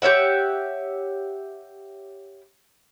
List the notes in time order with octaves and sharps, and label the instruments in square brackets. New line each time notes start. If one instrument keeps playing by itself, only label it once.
[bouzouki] G4 C#5 E5 F#5